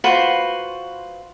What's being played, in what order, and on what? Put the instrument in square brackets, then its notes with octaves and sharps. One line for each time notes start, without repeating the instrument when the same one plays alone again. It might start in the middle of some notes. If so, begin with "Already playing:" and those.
[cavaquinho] F4 F#4 B4 C5